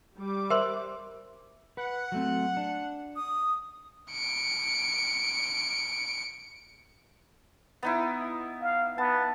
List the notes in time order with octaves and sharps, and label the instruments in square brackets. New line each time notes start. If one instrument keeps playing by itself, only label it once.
[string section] G3 D6
[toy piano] A#4 C5 C6 [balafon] E5
[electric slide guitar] B4 [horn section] F#5
[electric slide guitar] F#3 A3 C4
D4
[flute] D#6
[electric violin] C#7 D7
[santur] B3 D#4 E4
[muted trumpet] F5
[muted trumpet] B3 [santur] A5